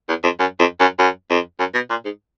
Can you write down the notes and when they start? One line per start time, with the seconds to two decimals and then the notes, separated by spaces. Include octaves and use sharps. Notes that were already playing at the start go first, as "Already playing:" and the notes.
0.09 E2
0.24 F2
0.39 F#2
0.59 F2
0.80 F#2
0.99 F#2
1.30 F2
1.59 F#2
1.74 B2
1.90 A#2
2.05 G#2